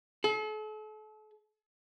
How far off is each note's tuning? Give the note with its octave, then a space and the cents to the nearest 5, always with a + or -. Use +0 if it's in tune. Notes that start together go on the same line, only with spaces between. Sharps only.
A4 -40